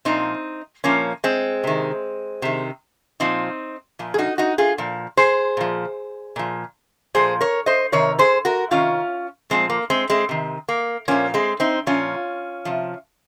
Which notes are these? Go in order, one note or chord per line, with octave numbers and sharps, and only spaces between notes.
A#2 F3 C4 D#4
A#2 F3 A#3 C#4
G#3 C4
C3 D#3
C3 D#3
A#2 F3 C4 D#4
A#2 F3
G#4
D#4 F#4
D#4 F#4
F4 G#4
A#2 F3
G#4 C5
A#2 F3
A#2 F3
A#2 F3 G#4 C5
A#4 C#5
C5 D#5
C3 D#3 A#4 C#5
G#4 C5
F#4 A#4
C3 D#3 C#4 F4
A#2 F3 G#3 C4
A#3
G#3 C4
G#3 C4
C3 D#3
A#3
A#2 F3 A#3 C#4
G#3 C4
C4 D#4
A#2 F3 C#4 F4
C3 F3